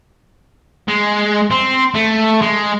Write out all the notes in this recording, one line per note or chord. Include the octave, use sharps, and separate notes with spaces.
G#3
C4
A3
G#3